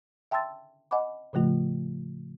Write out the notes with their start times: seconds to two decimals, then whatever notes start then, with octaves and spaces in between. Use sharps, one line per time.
0.31 E5 G5 A5 C6 E6 A6
0.91 D#5 F#5 G#5 B5 D6
1.33 A2 C#3 F3 A3 F4